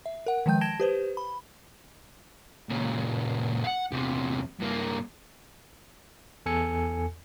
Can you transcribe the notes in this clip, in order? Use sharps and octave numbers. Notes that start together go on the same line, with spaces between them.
E5
A#4 F#5
D#3 F3 G#3 G5 G6
A5 G#6 A#6 D7 E7 G7
G4 B4 C5
B5
A#2 C#3
F5 F#5
E2 C3
G2 A#3
E2 A4 G#5 C#7